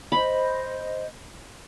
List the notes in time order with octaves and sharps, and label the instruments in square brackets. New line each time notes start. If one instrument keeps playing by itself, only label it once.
[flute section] C5 D#5 [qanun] B5